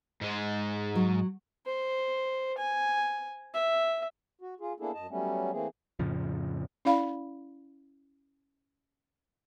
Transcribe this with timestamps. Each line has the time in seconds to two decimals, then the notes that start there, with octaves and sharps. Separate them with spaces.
0.21 G#2 G#3
0.95 F#3
1.66 C5
2.58 G#5
3.54 E5
4.41 F#4
4.60 F4 G#4
4.80 A#3 B3 D4 E4 G#4 A4
4.94 F#2 D#5 A5
5.10 F#3 G3 A3 B3 C#4
5.51 E3 A3 A#3 C4 G#4
5.99 F2 A2 C#3 F3
6.85 C#4 E4 D5 F5 B5